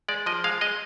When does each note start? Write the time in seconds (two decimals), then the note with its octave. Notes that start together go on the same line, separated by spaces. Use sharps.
0.08 G#3 D5
0.26 F3 D#5
0.44 G#3 F5
0.61 G#3 D#5